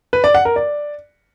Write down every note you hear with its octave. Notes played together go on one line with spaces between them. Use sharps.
B4
D5
F#5
A#4
D5